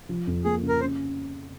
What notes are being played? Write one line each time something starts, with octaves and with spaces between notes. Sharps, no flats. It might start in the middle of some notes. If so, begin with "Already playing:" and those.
F3
F2
A#3 G#4
C#3
A#4
C#4 C5